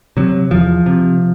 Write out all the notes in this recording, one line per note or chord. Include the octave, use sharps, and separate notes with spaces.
C3 F#3
E2 F3
C3